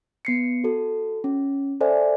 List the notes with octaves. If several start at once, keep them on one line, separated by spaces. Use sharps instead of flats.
B3 C7 C#7
F#4 A4
C#4
A4 C5 D5 E5 G#5